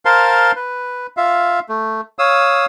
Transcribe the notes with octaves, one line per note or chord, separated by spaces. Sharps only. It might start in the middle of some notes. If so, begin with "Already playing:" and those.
A#4 C5 F5 A5 C6
B4
F4 E5 F5
A3
C#5 F5 D#6 E6